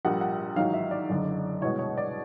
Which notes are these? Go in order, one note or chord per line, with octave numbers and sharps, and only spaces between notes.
A#1 A#2 G3 F#5
F#5
A1 G#2 D#3 F#3 F5
E5
D5
F#1 F#2 D3
C2 B2 G#3 C#5
C#5
D5